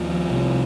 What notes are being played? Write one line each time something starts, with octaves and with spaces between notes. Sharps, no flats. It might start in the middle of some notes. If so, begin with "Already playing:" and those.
Already playing: D#2 F3
C2 C3